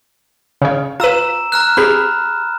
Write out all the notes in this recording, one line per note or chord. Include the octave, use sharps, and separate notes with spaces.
C#3 C#5
F4 B4 A#5 E6 E7
A#5 F6 F#6
C4 G4 G#4 B5